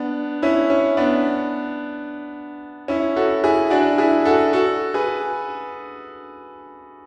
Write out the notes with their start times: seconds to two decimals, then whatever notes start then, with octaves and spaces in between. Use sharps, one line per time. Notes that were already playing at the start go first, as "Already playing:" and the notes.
Already playing: B3 D4
0.42 C#4 E4
0.70 C#4
0.97 B3 D4
2.88 C#4 E4
3.16 F#4 A4
3.44 E4 G#4
3.70 D4 F#4
3.98 E4 G#4
4.25 F#4 A4
4.53 F#4 A4
4.94 G#4 B4